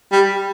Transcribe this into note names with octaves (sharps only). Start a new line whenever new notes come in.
G3